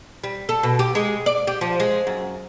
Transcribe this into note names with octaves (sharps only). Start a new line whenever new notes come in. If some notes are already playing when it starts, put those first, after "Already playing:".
G3
A4
B2
G4
G#3
D5
G4
F3
G#3
F#2